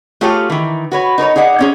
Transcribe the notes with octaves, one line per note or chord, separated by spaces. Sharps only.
A3 F4 G4 G#4 C#5 F5
D#3 E3
F#4 B4 C#5
D#4 A#4 B4 C#5
D#4 G#4 D5 F#5
C4 C#4 G#4